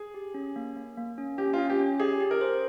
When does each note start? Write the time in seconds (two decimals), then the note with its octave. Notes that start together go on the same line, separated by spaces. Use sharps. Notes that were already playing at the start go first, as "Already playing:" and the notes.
Already playing: G#4
0.14 G4
0.34 C#4
0.56 A#3
0.76 A#3
0.97 A#3
1.18 C#4
1.38 C#4 G4
1.53 F4
1.59 C#4
1.70 G4
1.80 C#4
2.00 G4 G#4
2.20 G4
2.31 A#4
2.41 C5